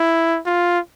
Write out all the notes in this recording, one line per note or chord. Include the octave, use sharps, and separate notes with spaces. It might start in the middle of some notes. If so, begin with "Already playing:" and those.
Already playing: E4
F4